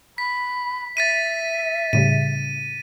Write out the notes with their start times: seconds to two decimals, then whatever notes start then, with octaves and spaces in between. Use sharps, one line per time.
0.18 B5 B6
0.97 E5 A6 B6 D#7
1.93 A2 C#3 G3 D#7